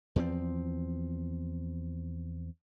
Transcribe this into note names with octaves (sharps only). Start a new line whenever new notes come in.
E2 F3 A3 C4